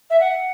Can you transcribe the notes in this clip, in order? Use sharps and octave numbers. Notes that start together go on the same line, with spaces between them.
E5
F#5